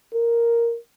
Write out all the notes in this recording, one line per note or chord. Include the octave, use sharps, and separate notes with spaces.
A#4